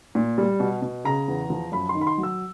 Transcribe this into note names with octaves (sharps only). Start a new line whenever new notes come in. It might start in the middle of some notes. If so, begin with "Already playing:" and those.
A#2
G3
B2
B2
C#3 A#5
E2
F3
F#2 B5
C6
D#3
B5
C6
F#3
E6